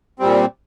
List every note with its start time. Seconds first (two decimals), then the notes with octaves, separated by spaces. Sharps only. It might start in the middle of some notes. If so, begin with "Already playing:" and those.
0.19 A#2 G3 C4